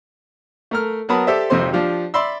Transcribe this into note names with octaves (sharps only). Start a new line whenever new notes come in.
A3 A#4 F6
F#3 B3 A#4 A5 B5 D#6
G4 A4 C5 D5 E5
G#1 F2 C3 C4 C5 C6
F3 D4 F4 G4
D5 E5 B5 C6 E6